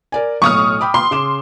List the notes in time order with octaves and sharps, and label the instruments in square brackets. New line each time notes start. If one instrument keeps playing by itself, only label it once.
[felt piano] A#4 D5 G#5
[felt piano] B1 A2 [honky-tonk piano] C#6 D#6 F6
[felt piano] G5 B5 D6
[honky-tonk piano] C6
[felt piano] C#3 D6 E7